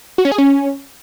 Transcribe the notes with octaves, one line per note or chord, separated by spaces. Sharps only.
F#4
C#4
G#4
C#4